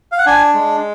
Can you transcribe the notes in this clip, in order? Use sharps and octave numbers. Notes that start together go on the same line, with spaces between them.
F5
F#5
D4 G#5
G#3